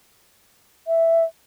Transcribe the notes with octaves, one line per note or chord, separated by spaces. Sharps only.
E5